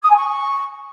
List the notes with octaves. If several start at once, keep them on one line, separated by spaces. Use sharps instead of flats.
D#6
G#5
C#6